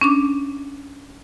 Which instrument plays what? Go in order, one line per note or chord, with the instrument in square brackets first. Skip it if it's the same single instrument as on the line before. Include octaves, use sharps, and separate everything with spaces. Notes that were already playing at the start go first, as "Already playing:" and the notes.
[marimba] C#4 D4 D6